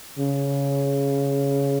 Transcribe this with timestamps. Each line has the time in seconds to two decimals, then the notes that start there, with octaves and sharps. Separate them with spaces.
0.18 C#3